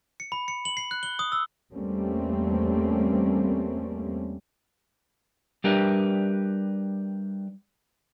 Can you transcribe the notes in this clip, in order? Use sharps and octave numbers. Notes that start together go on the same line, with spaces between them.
C#7
B5
C#7
F#7
C7
F#6
G7
D#6
E6
E2 G3 A3 A#3 C4 C#4
G3 D4 G4 A#4 B4 E5